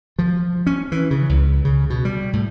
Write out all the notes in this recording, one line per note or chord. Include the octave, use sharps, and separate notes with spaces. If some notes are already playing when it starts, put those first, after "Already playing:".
F3
C#4
E3
C#3
C#2
C#3
B2
G3
A2